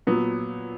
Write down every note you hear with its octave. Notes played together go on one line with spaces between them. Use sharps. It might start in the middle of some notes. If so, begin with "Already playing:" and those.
A#2 F#3 B3